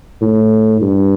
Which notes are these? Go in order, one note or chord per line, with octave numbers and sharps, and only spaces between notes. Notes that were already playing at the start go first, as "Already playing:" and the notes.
A2
G2